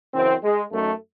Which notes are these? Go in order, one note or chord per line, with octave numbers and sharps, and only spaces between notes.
F#2 C#3 E3 C4
G#3
F#2 D#3 A3